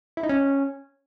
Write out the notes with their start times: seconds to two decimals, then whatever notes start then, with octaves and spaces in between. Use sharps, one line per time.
0.17 E4
0.23 D#4
0.29 C#4